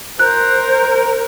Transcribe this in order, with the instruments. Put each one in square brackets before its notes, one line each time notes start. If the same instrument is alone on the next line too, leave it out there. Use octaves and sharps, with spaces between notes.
[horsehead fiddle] A#4 [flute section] C5 [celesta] F#6